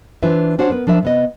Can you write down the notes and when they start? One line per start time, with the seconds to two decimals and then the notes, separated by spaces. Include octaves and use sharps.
0.23 E3 D4 F4 B4 C5 E5
0.58 C#4 D4 F#4 C5 C#5 F#5
0.70 B3 A#4 B4
0.87 F3 D4 A#4 E5
1.03 C3 B3 D#5